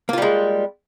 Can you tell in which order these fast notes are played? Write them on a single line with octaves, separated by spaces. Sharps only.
A#3 F4 G3 G#3